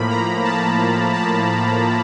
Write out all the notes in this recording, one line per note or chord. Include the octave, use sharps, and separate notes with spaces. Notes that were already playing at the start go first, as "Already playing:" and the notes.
Already playing: A2 F3 A#3 B5
A#5
A5
A5